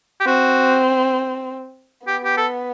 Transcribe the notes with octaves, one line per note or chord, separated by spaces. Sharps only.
G4
C4 F#4
B3 G4
G4
A4